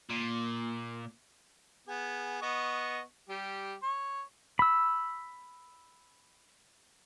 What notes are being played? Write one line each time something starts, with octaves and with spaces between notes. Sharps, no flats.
A#2
B3 G#4
B3 D#5 C#6
G3 G4
C#5
B5 E6